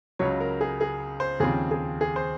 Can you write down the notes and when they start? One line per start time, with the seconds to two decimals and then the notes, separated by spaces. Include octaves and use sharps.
0.19 C#2 C#3 F#3 C#5
0.40 A#4
0.61 G#4
0.81 G#4
1.20 C5
1.40 D#2 C#3 F3 C4 G#4
1.71 G#4
2.01 G#4
2.16 C5